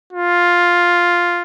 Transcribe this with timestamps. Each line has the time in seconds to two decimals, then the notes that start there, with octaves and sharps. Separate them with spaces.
0.13 F4